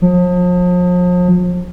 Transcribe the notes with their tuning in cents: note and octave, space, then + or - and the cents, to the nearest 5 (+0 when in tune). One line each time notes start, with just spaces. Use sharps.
F3 +40